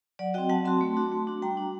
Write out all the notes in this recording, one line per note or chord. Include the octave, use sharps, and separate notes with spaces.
F#3 D5 F#5
C4 F#4 D#5 G5
F#3 F#5 A5
C4 F#4 A5 C6
A3
D4 F#4
A3
D4 F#4
G3 G5 A#5
D4 F#4